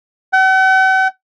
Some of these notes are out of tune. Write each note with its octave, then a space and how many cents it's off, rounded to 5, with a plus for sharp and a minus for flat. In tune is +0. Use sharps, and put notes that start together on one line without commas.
F#5 +45